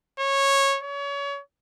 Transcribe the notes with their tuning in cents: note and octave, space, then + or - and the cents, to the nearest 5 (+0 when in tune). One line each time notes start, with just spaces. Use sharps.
C#5 -15
C#5 +30